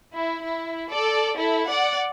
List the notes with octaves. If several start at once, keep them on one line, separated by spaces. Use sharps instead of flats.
E4
E4
A4 D5
E4 A4
D5 F#5